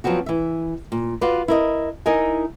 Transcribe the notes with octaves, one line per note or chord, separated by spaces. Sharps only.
F3 F#3 B3 C4 F#4
E3 E5
A#2
F4 F#4 B4 D5
E4 A#4 D#5
D#4 E4 A#4 D#5 G#5